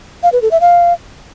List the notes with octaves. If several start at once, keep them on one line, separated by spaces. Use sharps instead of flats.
F5
B4
A4
E5
F5